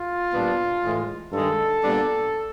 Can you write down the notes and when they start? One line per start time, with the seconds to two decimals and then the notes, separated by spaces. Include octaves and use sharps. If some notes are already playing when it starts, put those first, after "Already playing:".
Already playing: F4
0.33 A#2 G3 B3 D4
0.82 A2 E3 G#3
1.32 G2 D#3 G#3 A4
1.82 A#2 G3 B3 D4